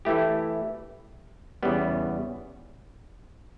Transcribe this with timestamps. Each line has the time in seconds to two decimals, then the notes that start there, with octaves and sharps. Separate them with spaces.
0.05 E3 A3 E4 G4
1.63 E2 C#3 G3 B3